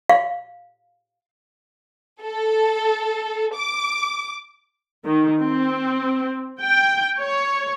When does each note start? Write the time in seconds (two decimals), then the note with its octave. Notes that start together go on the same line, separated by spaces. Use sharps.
0.09 F5
2.22 A4
3.55 D6
5.04 D#3
5.43 C4
6.62 G5
7.20 C#5